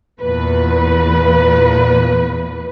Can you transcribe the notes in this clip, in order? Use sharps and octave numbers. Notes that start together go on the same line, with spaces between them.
E2 A#2 B4